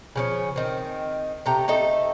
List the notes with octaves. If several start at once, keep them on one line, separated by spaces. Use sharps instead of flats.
C#3 F3 C#4
D#3 C4
C3 A3 G5 A#5
A3 C4 D#4 A4